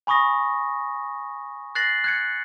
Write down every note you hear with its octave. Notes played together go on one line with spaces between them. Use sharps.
G#5 B5 C#6 D#6 A#6
F#6 A6 A#6 C7 F#7
F#6 G#6 C#7